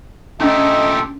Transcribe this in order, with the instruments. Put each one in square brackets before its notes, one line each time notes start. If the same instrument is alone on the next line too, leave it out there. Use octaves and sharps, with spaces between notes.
[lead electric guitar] A#2 A3 [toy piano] C#4 D4 [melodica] G4 A4 [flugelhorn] D#5